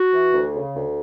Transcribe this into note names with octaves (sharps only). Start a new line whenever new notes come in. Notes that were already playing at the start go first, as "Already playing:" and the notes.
Already playing: F#4
E3
D2
C#3
D2